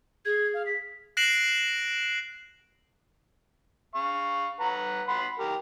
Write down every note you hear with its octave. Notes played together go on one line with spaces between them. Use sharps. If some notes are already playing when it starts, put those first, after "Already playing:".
G#4 G#6
F5
B6
F#6 A#6 C7 D7 E7 F#7
F5 C#6
B4 F#5 A#5
F#5 B5 C6
G4 A#4